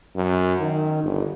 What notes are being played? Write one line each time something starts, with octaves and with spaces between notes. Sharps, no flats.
F#2
D#3
G1